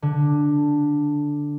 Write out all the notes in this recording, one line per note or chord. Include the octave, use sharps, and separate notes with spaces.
D3